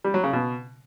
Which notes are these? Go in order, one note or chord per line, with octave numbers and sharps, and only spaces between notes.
G3
F#3
C#3
B2